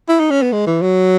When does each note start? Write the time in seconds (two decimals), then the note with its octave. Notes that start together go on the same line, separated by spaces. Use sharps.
0.09 E4
0.20 D#4
0.31 C#4
0.42 B3
0.53 G#3
0.67 E3
0.82 F#3